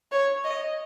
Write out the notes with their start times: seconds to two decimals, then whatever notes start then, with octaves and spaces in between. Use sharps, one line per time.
0.12 C#5
0.44 D#5